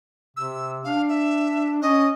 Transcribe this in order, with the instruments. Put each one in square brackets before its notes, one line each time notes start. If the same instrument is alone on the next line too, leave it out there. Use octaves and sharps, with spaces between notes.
[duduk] C3 [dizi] E6
[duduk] D4 [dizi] F5
[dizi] E5
[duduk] C#4 [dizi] D#5